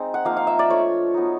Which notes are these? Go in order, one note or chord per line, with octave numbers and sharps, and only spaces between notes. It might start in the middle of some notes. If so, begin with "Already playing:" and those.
Already playing: G#3 C4 D#4
F#5
F3 A#3 D#4 F5
F5
E5
D5
A3 D4 F4 C#5
F#3 B3 D#4